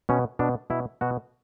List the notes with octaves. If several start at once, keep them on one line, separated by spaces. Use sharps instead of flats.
B2 C#4
B2 D4
B2 E4
B2 F#4